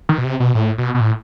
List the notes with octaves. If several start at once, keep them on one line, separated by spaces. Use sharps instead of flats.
D#3
B2
C3
B2
A2
B2
B2
A2